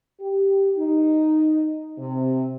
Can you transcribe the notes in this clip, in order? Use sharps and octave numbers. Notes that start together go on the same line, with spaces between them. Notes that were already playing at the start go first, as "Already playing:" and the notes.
G4
D#4
C3